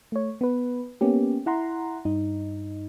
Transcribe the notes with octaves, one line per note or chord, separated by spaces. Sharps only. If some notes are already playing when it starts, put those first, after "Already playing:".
A3 C#5
B3 B4
A#3 B3 C#4 G4
E4 F#5 A#5 C6
G2 D#4